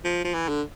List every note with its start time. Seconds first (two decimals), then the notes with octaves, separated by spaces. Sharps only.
0.05 F3
0.24 F3
0.34 E3
0.49 D3